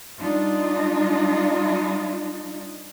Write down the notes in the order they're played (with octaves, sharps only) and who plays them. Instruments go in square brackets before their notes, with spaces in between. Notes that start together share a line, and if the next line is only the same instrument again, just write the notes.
[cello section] G3 D4 D#4 F4